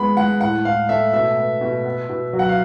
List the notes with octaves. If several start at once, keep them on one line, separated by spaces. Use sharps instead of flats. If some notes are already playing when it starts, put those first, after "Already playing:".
Already playing: G#3 B3 B5
G#3 F#5
A2 F#5
A2 F5
A3 E5
B2 E5
B3
B2
B3
B2
F#3
F#5
F5